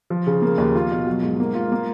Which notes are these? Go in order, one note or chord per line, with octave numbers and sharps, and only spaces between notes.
F3
C#3
A#3
D#2
F4
B2
F#3
G#2
A#3
F4
A#3